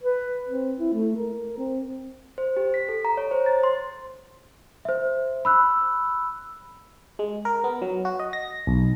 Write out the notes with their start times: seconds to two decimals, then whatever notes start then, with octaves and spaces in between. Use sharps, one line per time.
0.03 B4
0.48 C4
0.79 E4
0.94 A3
1.17 A#4
1.58 C4
2.38 C5
2.57 G4
2.74 B6
2.89 A4
3.05 A#5
3.17 C#5
3.31 C5
3.46 A6
3.64 C6
4.85 C5 E5
5.45 B5 E6 F#6
7.19 G#3
7.45 A#4
7.64 B3
7.82 F#3
8.05 F#4
8.19 D#5
8.33 A#6
8.67 B1